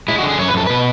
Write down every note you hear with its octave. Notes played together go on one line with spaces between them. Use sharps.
G#3 E4
F#4
D3
G#4
F#2 C#5
B4
F#2 A4
B2 B4